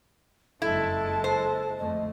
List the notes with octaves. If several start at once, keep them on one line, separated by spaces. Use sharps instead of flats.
F#1 F2 G#3 E4 A4 A5
C5
F2 D3 A3 D#5